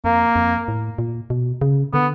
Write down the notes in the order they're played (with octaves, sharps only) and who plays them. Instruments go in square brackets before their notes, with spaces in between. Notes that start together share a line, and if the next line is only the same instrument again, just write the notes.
[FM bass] F2 [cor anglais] A#3
[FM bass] F2
A2
A#2
B2
C#3
[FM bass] D3 [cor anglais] B3